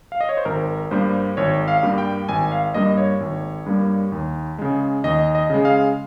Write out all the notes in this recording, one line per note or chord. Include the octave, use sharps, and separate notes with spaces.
F5
D#5
C#5
C5
G#1 A#4
G2 G3 A#3 C5
G#1 C#5
F5
G2 G3 A#3
G5
G#1 G#5
F5
G2 G3 A#3 D#5
C#5
G#1
G2 G3 A#3
D#2
C#3 G#3
D#2 D#5
D#5
C#3 G#3
F5